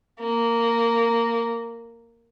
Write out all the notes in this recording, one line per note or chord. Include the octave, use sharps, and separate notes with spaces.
A#3